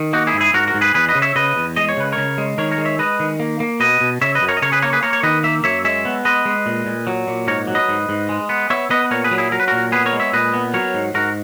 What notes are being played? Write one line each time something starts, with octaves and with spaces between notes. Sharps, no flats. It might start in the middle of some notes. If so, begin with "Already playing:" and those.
Already playing: D#3
A#3 D#4 F#4
E4 G#4
G#2
E4 G#4
G#2 F#4 A#4
F#4 A#4
G#2
G#4 B4
E2 G#4 B4
B4 D#5
C#3
C#5 E5
C#3 B4 D#5
E2
G#3 D#5
C#5
C#3 B4
C#3 A#4 C#5
G#3
D#3 A#4 C#5
A#4 C#5
G#3
C#5 E5
G#3 B4 D#5
D#3
A#3
A#3
B2 B4 D#5
B2
C#3 C#5 E5
B4 D#5
F#2
A#4 C#5
D#5
C#3 A#4 C#5
G#4 B4
A#3 A#4 C#5
G#4 B4
A#3 A#4 C#5
C#5
D#3 B4 D#5
A#3 E5
F#2 C#5 E5
G#3 C#5 E5
B3
G#3 B4 D#5
G#3
A#2
A#2
F#3
A#2
G#2 A#4 C#5
F#3
B4 D#5
G#2
G#2
G#3
B3
B3 C#5 E5
B3 B4 D#5
B4
A#2 A#4 C#5
G#4 B4
F#3
E4 G#4
F#3 A#4
B4
A#2 F#4 A#4
B3 G#4 B4
A#4 C#5
G#3
C#5 E5
A#2 B4 D#5
B3
F#3 A#4 C#5
G#2
G#2 F#4 A#4